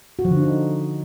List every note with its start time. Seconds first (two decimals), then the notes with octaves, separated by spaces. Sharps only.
0.19 F#4
0.25 F3
0.31 D3
0.37 D4
0.43 D#4